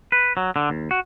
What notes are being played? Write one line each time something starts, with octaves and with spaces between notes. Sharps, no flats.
B4
F#3
D3
D#2
F#4